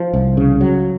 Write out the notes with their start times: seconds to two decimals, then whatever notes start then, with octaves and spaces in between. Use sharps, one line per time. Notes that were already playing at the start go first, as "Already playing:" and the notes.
Already playing: F3
0.14 C2
0.37 C#3
0.61 F#3